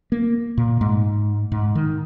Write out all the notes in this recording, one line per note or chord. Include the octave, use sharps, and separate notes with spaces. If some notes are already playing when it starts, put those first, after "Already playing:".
A#3
A#2
G#2
G#2
D#3